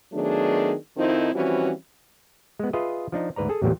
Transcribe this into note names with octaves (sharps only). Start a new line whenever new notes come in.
D#3 F#3 A3 B3 D4 G#4
F2 D#3 F3 C4 D#4 E4
E3 F3 G3 C4 C#4 F#4
G#3 B3
F4 G#4 B4 D#5 E5
F3 D4 D#4
D2 G#2 B4 D5 A#5
G#4 A4 G#5 A5
A1 E2 A#2 F#3 G3